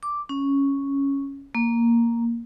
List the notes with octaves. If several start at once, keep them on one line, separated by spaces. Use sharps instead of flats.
D6
C#4
A#3